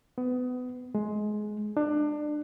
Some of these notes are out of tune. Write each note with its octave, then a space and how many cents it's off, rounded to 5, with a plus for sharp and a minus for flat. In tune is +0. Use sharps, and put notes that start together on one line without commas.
B3 +25
G#3 +20
D4 +25